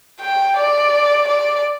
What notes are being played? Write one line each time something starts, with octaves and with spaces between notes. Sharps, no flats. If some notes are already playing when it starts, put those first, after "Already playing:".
G5
D5
D5